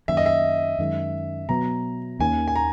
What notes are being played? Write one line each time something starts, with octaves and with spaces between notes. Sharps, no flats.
F#2 D#3 A#3 E5
D#5
E5
F#2 D#3 G#3
B2 F#3 B3 A#5
D#2 D#3 A#3 C#4 G#5
G#5
A#5